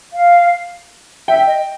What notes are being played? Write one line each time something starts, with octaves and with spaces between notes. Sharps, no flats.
F5
E5 G5
D#5